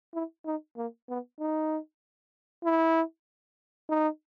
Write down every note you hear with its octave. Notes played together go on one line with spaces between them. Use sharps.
E4
D#4
A#3
B3
D#4
E4
D#4